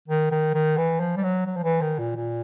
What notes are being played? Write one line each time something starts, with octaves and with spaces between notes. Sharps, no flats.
D#3
D#3
D#3
E3
F3
G3
F#3
F#3
F3
E3
D#3
A#2
A#2